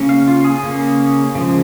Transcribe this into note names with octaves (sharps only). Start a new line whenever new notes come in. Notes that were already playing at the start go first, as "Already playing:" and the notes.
Already playing: C#3 A#3 C#4
F5
F4
G#4
C#3 A#3 C#4
C#3 F3 G#3